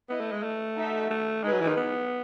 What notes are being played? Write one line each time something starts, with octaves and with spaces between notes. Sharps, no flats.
B3 E4 B4 D#5
A3
G#3
A3
D#4 F#4 A4 E5
A3
G#3 D#4 G#4 B4
F#3
E3
D#3
B3